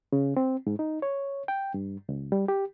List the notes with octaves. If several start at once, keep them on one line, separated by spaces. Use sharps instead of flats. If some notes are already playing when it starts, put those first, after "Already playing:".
C#3
C4
G#2
D#4
C#5
G5
G2
C#2
G3
G4